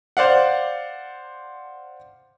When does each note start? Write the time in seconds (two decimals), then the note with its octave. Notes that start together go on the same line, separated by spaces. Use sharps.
0.17 C5 D5 F5 F#5